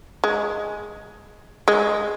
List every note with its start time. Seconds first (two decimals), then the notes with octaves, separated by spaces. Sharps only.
0.24 G#3
1.68 G#3